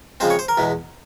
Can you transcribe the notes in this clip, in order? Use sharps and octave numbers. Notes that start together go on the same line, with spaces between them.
C#3 F3 G#3 C4 C5
C#5
C5
A#4
E2 B2 G#3